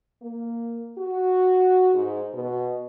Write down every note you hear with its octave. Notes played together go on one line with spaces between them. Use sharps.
A#3
F#4
G#2
B2